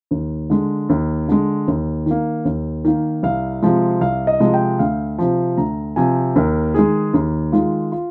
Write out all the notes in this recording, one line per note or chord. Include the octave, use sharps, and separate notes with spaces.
D#2
D3 G#3
D#2
D3 G#3
D#2
D#3 A#3
D#2
D#3 A#3
C2 F5
C3 F3 G#3
C2 F5
D#5
C3 F3 G#3
G5
D2 F5
C3 F3
D2 A#5
C3 F3 G#5
D#2 A#4
D#3 G#3 G#4
D#2
D#3 G#3 F4
F4